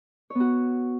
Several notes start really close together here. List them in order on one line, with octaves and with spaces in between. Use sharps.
C#5 B3 F#4